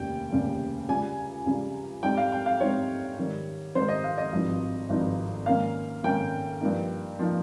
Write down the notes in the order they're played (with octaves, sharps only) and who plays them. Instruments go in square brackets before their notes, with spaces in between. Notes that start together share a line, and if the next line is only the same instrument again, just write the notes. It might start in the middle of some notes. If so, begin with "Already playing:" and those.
Already playing: [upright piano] F1 D#2 C#3 G3 G5
F1 D#2 C#3 G3
C#2 C#3 G3 G#5
C#2 C#3 G3
G#2 G3 C4 D#4 G5
F5
G5
F5
G#2 G3 C4 D#4 C#5
G#2 D#3 G3
G#2 D#3 G3 C5
D#5
F5
D#5
G#1 G2 F3 C4 D#4
G#1 G2 F3 C4 D#4
G#2 D#3 A#3 C#4 F5
G#2 D#3 A#3 C#4 G5
G2 F3 A#3 D#4
F3 A#3 D#4